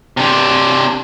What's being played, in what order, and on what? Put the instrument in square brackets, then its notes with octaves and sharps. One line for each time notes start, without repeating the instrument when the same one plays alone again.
[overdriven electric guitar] C3 D4